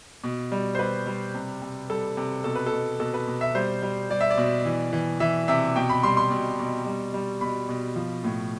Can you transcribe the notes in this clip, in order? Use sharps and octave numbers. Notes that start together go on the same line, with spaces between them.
B2
G3
C5
G3 B4
G3
C3
C3
G3 A4
C3
B2 A4
B4
A4
B2
B2 A4
B4
B2
E5
G3 C5
G3
G3 D5
E5
D5
B2
E3
E3
E3 E5
C3 E5
B2 G5
B5
G3 C6
C6
B2
B2
G3
G3
B2 B5
B2
F3
A2